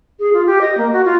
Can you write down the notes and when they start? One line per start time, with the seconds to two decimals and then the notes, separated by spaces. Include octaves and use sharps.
0.19 G#4
0.34 F4
0.46 G4
0.61 D#5
0.77 A#3
0.93 F#4
1.05 F4